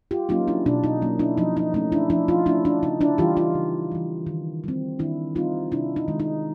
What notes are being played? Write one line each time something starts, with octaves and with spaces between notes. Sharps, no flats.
F4 G4
F#3 A#3 C#4 D#4 F4
D4 E4
B2 D4
D#4
F#3 A#3 C#4
D4 E4
F3 D#4
D#4
A3 C#4 D#4
D4 E4
F3 D4 E4
D#4 F4
A3 C#4 D4 E4
D4
C#3 D#4
D4 E4
E3 G3 F4 G4
D#4 F4
C#3
E3 G3
D#3
G3 C4
D#3 D4 E4
G3 C4 D#4 F4
C3 D4 E4
D#4
D#3 G#3
D#4